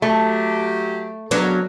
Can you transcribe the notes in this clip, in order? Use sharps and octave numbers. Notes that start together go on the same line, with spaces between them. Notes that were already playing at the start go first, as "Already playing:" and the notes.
F#3 A3 G4
A2 C#3 F#3 B3 D4 A#4